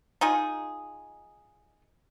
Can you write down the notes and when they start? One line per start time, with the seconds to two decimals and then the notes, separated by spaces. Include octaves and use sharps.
0.21 D#4 F4 G#4